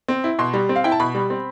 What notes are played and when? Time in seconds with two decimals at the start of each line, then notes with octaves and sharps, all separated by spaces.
0.08 C4
0.24 E4
0.39 B2 C6
0.53 G3
0.69 C4
0.76 F5
0.84 E4 G5
0.92 A5
1.00 B2 B5
1.15 G3
1.30 C4